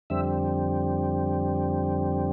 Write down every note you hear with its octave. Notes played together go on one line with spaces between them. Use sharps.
F2 D3 G3 C4 E5